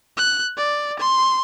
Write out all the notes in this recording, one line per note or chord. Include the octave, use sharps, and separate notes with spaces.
F#6
D5
C6